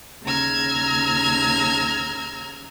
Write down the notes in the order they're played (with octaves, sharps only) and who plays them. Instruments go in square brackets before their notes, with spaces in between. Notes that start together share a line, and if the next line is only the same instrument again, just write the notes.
[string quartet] D#2 C#3 A#5 E6 F6 G#6